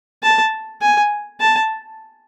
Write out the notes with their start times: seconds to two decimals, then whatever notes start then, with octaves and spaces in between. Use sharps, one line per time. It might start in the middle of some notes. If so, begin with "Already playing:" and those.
0.23 A5
0.81 G#5
1.40 A5